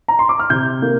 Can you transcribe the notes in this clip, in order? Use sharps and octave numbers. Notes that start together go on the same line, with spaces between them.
A#5
C6
D6
F6
C3 G6
A#3